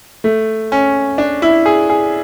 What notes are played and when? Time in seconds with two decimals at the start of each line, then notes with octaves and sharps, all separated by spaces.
0.24 A3
0.72 C#4
1.18 D4
1.42 E4
1.66 G#4
1.90 G#4